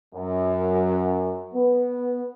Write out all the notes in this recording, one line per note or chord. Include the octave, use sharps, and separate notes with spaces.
F#2
B3